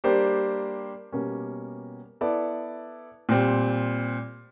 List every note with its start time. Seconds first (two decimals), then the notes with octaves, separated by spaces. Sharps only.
0.04 G3 A#3 D4 G4 C5
1.12 B2 G3 A#3 C#4
2.21 B3 E4 A4 D5
3.29 A#2 G3 C4